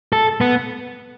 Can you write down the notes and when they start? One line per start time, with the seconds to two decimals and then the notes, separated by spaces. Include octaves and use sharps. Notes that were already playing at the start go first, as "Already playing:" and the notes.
0.13 A4
0.41 B3